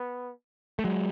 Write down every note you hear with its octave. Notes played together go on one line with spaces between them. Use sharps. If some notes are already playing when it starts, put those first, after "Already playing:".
Already playing: B3
A3
F#3 G#3